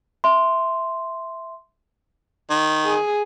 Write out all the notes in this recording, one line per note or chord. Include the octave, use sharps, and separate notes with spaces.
E5 C6
D#3
G#4